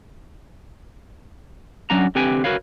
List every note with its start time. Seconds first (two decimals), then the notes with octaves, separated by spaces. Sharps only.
1.90 F#3 C#4 D4 F#4 A#5
2.15 D3 C4 G4 B4 G5 G#5
2.44 F#4 A#4 B4 C#5 F5